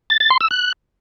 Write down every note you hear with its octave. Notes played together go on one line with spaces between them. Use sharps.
A6
A6
C6
E6
F#6